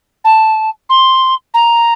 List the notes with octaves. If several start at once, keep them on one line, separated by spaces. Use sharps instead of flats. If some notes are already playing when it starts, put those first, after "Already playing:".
A5
C6
A#5